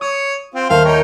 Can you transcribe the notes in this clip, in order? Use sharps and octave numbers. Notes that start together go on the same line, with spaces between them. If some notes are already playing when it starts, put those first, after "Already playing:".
C#5 D#6
C4 F4
D#2 D#3 A3 C5 F5
D#4 A#4 C#5 G5